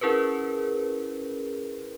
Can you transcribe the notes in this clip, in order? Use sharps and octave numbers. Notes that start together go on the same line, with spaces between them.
C#4 E4 G#4 A#4 B4